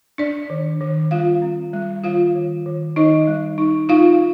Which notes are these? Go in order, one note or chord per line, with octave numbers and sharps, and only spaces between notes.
D4 D5
D#3
D#3
G3 F4 F5
C4
G3
D#3 F4 F5
D#3
D#3
D#3 D#4 D#5
G3
D#4
D#4 F4 F5